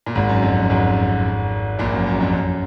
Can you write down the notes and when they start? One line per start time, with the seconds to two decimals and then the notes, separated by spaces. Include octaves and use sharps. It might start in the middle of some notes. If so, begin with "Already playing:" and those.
0.06 A#2
0.15 G#1 G#2
0.29 F#2
0.42 F2
0.56 F#2
0.69 G#1 G#2
1.79 A#1 A#2
1.93 F#2
2.07 F#2
2.21 F2
2.33 F#2